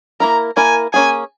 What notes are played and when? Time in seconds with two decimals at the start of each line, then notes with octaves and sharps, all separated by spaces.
0.20 A#3 E4 A#4 A#5
0.57 A#3 E4 A#4 G#5
0.93 A#3 C#4 G#4 G#5